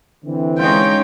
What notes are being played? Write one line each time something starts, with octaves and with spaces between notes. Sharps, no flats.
D3 E3 C4
G#3 C#4 D#4 F4 C#5 G5